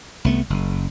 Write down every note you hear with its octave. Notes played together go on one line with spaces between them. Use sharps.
C2 A3 B3
F#1